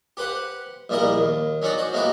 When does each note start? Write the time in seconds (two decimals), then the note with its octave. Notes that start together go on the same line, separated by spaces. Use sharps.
0.17 G4 B4 C5 F#5
0.89 A#1 A#2 G3 E4 A#4 D#5
1.18 D#2
1.62 F#3 C#4 D#4 F#4 D5
1.78 F#4 C5
1.93 F#3 G#3 A#3 E4 F#4 G4